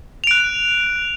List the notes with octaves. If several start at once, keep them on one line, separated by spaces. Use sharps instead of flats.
F#6 D7 F7